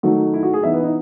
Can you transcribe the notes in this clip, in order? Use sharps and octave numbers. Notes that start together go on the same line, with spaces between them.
D#3 F#3 A3 D#4 F#4
E4
F#4
G#4
E3 B3 D#4 E5
B4
D#4